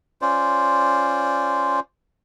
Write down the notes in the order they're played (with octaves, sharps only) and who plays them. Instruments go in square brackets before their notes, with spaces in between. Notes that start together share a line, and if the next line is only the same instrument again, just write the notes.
[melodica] C#4 F4 C5 D5